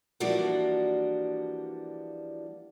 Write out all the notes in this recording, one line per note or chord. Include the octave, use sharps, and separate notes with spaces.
E3 F3 G3 A#3 D4 F#4